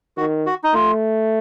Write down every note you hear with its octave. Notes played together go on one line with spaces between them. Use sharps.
D#3 F#4
F#4
D#4
A3 F4